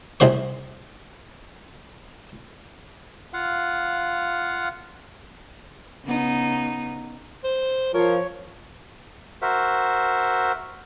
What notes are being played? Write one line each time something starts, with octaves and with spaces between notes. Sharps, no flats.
C2 C3 C5 C#6
F4 F5 F#5
C#3 B3 D#4
C5
F3 A#4 C#5
F#4 A#4 C5 E5